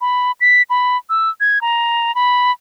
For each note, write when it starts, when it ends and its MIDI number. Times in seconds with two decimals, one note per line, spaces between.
0.01 0.32 83
0.41 0.62 95
0.70 0.97 83
1.10 1.30 88
1.40 1.61 92
1.61 2.14 82
2.15 2.51 83